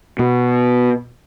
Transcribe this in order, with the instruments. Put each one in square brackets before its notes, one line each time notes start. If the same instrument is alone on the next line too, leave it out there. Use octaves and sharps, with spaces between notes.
[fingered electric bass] B2